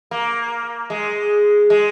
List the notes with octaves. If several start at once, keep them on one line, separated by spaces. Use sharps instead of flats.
A#3
G#3
G#3